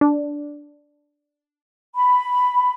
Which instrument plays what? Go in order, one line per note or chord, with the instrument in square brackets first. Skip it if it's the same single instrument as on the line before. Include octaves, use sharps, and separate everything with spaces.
[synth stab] D4
[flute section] B5